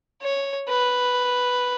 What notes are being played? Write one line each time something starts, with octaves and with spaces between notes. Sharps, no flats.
C#5
B4